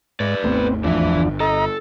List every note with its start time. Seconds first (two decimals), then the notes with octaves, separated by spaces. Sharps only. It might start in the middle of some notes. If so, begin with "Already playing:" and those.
0.20 G#2 B4 D5
0.44 G#1 D#2 A3 B3 C4
0.84 E2 E3 F3 D4 E5
1.14 G1
1.40 A4 D#5 A#5